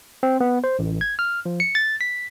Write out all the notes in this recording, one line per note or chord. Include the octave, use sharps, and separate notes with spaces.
C4
B3
C5
A1
G#6
F6
F3
C#7
A6
B6